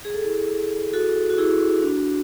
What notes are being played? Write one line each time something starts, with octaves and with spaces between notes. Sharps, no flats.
G#4
A4
E4 G#4
F#4 A4
F#4
E4 G#4
D4 F#4